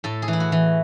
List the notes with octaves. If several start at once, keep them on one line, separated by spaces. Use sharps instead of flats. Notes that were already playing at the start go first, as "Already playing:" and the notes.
A2 A4
G#4
E3
E4
F#4
E3